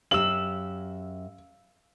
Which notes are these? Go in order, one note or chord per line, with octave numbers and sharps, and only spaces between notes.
F#2 G4 F5 E6 F#7